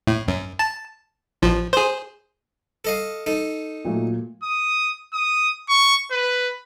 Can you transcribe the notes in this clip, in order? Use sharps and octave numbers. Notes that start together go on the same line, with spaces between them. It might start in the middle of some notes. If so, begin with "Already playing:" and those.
A2
F#2
A5
A1 F3
G#4 C5
A4 D#5 F5
D#4 A4
A#2 F#3 A3
D#6
D#6
C#6
B4